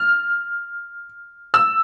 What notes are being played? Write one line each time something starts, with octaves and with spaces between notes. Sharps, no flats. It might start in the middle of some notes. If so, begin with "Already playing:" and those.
Already playing: F6
E6